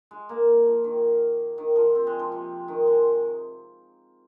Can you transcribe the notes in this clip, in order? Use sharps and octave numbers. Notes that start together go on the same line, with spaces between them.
G#3
A#3
F3
D#3
D#3
F3
C4
G#3
F3
C3
D#3
G#3